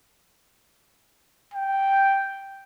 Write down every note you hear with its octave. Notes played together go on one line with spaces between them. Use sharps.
G5